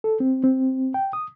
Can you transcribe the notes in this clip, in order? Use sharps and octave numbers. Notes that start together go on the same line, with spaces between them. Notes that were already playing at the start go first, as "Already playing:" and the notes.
A4
C4
C4
G5
D#6